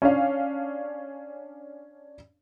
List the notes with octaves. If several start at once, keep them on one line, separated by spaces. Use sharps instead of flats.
C#4 D4 F5